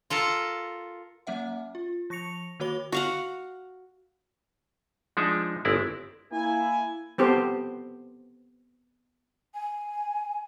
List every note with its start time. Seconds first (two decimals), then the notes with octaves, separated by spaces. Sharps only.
0.10 F4 A4 A#4 A5
1.27 F#3 A#3 C#4 E5 F#5
1.75 F4
2.10 F3 C#6 A#6 C#7 F7
2.60 D#3 A#3 F#4 C#5 B5 G7
2.92 F#4 F5 F#5
5.17 F3 G#3 D4 D#4 E5
5.65 G1 G#3 C4 E4 D5
6.32 A#3 E4 G#5
7.18 B3 C4 G4 A4 C5
9.54 G#5